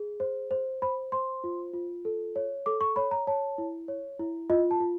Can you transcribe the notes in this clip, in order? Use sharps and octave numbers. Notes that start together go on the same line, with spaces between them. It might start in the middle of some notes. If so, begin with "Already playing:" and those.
Already playing: G#4
C5
C5
C5 B5
C5 C6
F4
F4
A4
C#5
A4 D6
C#6
C#5 B5
A#5
C#5 A5
E4
C#5
E4
F4 D#5
A5
F4